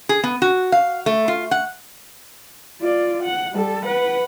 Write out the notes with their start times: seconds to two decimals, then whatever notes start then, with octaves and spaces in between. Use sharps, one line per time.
0.09 G#4
0.24 B3
0.42 F#4
0.72 F5
1.06 A3
1.28 F4
1.51 F#5
2.81 F4 D5
3.23 F#5
3.53 G3 A4
3.85 B4 F#5